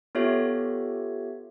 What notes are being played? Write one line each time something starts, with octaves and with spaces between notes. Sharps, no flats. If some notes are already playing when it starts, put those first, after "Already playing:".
B3 F4 G4 A4 C#5 E5